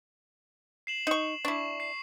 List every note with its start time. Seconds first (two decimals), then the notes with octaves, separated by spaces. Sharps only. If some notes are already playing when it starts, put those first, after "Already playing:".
0.87 C7 E7 F#7
1.07 D#4 C#6
1.45 D4 E4 C#6
1.80 C7